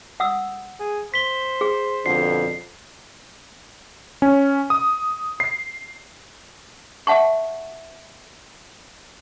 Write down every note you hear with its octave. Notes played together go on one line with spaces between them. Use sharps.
F#5 D#6 E6
G#4
C5 B6 G7
G#4
F2 B2 D3 C7
C#4
D#6
C7
E5 F#5 A5 C#6